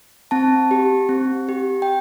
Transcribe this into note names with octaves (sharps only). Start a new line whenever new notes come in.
C4 A5
G4
C4
G4
G5